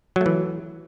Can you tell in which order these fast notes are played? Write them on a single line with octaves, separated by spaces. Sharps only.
F#3 A3 E3